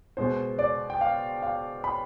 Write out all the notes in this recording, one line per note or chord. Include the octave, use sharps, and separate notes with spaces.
B2 G#3 B3 C5
D5
G5
F5
F5
B5